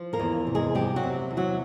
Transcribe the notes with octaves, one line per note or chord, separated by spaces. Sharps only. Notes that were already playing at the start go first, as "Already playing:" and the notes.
Already playing: F3
A#3 A#4
E2
C3
G#3 G#4
F3 G3 G4
F#3 F#4
C3
E2
F#3 F#4